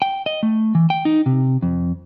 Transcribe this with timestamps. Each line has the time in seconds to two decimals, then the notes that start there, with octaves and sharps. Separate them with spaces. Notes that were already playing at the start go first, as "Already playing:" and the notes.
0.02 G5
0.26 D#5
0.43 A3
0.75 E3
0.90 G5
1.05 D#4
1.26 C3
1.63 F2